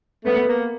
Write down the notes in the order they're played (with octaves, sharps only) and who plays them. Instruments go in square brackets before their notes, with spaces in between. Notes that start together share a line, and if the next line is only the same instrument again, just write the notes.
[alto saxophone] A3 [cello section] B3
[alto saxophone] A#3